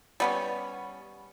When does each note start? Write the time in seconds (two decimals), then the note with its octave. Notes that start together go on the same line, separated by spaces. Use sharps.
0.20 G3 B3 C#4